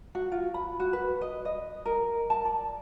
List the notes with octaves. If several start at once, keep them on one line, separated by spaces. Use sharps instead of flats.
F#4
F4
B5
F#4
B4
D#5
D#5
A#4
A5
D5